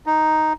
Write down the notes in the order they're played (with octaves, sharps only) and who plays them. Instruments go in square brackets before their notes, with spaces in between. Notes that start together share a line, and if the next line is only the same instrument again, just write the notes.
[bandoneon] D#4